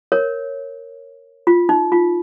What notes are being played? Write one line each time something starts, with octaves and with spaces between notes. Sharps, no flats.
A#4 C#5
F4
D#4
F4